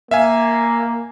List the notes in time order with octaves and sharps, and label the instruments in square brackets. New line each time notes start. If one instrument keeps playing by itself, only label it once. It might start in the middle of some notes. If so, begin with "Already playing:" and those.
[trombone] A#3 [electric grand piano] E5 F5 G#5